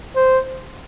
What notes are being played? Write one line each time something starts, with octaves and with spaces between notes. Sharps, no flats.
C5